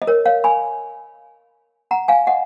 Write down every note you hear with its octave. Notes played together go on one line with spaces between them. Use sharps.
D#5
A#4 C#5
C#5 F5
G#5 B5
F#5 A#5
F5 G#5
D#5 F#5